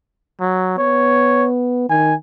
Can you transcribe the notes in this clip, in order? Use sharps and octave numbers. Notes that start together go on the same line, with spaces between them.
F#3
B3 C#5
D#3 G#5